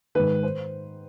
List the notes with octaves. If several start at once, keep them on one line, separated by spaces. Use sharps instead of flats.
G#2 D#3 B4
C5